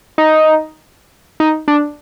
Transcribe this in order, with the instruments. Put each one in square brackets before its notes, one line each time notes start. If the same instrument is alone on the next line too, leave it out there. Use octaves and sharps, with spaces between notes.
[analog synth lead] D#4
D#4
D4